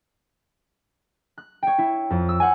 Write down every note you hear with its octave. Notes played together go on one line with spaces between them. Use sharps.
F#6
C#5 G5
E4
F2
E6
C5 F#5 G#5